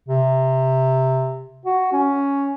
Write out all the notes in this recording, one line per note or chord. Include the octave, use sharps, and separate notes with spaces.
C3
F#4
C#4